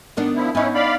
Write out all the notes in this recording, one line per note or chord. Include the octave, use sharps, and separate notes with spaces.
D#3 B3 D4
F3 E4
B3 C#4 D#4 E4
D5 F5 B5